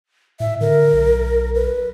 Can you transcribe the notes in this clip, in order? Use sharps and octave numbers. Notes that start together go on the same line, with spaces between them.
A2 E5
D3 A#4
B1
B4